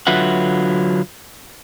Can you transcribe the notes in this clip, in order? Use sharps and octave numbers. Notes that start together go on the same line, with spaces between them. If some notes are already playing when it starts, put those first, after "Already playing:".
D3 F#3 F4 B4 E5 F#5